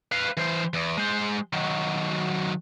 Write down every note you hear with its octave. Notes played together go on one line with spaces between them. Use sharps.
B4 F5
E3 C5
E2
G#3 C5
D#3 F#3